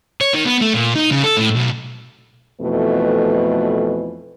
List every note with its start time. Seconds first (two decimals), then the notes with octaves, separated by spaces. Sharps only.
0.21 C#5
0.34 D#3
0.46 B3
0.62 A3
0.74 A#2
0.96 D#4
1.11 C#3
1.24 A4
1.37 A2
1.56 B1
2.60 F2 B2 E3 A3 B4